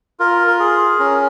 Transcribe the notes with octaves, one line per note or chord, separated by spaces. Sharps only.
F4 A#4
A#4
G#4
C#4 A#4